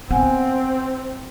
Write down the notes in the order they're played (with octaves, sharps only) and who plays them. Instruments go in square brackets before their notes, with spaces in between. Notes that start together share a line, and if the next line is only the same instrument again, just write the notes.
[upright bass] B3 [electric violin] C4 [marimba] F#5 G#5